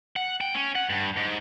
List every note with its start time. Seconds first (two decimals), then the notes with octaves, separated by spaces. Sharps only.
0.16 F#5
0.41 G5
0.54 C#4
0.75 F#5
0.90 G2
1.17 G#2